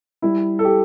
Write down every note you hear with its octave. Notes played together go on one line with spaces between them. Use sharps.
G3 E4
A4
G4